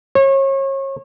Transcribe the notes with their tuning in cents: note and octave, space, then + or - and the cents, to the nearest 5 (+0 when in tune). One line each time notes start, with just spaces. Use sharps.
C#5 -35